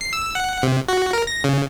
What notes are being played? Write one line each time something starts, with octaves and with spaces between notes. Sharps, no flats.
C7
E6
F#5
C3
F#4
A#4
A#6
C#3